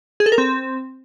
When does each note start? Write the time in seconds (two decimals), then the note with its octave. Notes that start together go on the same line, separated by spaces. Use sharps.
0.20 G#4
0.26 A4
0.32 A#4
0.38 C4